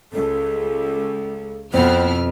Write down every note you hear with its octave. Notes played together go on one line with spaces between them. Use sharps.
C#2 A4
F2 B2 B3 C4 E4 F6